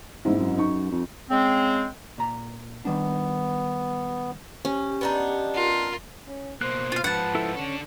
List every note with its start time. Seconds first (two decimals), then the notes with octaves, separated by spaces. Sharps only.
0.25 D#1 G#2 C4 E4
0.39 F#2
0.58 D#4 C#6
0.92 F2
1.31 C#3 G#3 C4
2.18 A#2 A#5
2.85 D#3 G3 B3 D4
4.65 C#4 G4
5.01 B3 D4 D#4
5.54 F4 A#4
6.26 C#4
6.61 B2 A#3 C5 F#6
6.92 F4 F5
7.04 G#2 F3 B4 F#5 A5
7.35 E4 A4
7.55 C#4 D4 A4